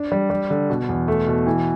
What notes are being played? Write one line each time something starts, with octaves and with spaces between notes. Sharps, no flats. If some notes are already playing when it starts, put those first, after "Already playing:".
Already playing: D4
G3
G3
D3
B2
E2
A3
B2
E3